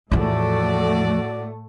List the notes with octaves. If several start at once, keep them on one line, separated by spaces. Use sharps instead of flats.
E2 A2 F3 A3 F#4 D5